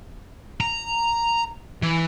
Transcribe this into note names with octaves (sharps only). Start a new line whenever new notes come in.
A#5
E3